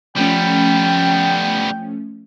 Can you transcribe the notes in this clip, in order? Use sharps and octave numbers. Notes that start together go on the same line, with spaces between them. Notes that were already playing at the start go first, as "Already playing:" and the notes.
F3 G3 A3 B3 C#4 G5